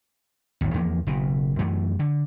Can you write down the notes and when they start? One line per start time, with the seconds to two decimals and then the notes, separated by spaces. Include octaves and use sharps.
0.61 G#1 D#2
0.74 E2 F3 F#3 A#3
1.07 F#1 B2
1.59 F#2 E3 A3
1.99 D3